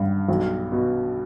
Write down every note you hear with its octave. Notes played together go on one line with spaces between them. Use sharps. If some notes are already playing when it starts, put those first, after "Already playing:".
Already playing: G2 G3
B1
B2